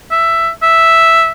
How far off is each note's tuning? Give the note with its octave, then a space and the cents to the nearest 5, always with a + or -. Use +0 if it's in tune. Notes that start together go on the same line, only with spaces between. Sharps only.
E5 +10
E5 +0